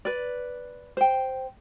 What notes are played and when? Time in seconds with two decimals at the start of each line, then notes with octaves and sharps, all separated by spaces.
0.05 B4 D5
0.97 C5 G5